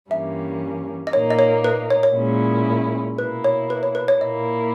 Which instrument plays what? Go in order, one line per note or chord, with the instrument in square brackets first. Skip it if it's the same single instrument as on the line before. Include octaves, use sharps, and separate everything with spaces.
[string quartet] G2 E3 G3 A#3 C#4 [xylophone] E5
[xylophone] D#5
[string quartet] A#2 A#3 D#4 [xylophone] C#5
[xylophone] D#5
C#5
B4
C#5
C#5
[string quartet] A#2 G#3 C#4 E4
[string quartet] B2 A#3 E4 [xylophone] B4
[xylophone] C#5
B4
C#5
B4
C#5
[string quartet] A#2 A#3 E4 [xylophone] D#5